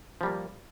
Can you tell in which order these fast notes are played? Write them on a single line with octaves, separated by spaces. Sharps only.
F3 G3 A#3